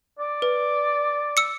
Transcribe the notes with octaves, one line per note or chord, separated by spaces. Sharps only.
D5
B4
E6 C#7